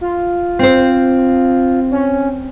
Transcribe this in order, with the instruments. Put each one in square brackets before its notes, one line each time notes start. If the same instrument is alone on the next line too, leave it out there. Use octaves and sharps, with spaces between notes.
[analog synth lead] F4
[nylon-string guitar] C4 C5
[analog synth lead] C#4